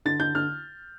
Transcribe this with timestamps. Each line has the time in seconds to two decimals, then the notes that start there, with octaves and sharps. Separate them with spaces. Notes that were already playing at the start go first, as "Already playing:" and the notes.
0.05 D3 A6
0.20 D3 G6
0.35 D3 F6